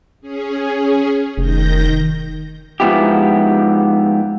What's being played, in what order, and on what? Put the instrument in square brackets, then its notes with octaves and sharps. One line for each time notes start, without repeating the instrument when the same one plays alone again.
[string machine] C#4 G#4
[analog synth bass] F1 [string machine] D#3 G6 A#6
[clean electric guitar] G#2 F3 B3 E4 G4